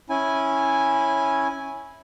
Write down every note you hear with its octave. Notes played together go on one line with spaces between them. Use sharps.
C#4 E4 G#5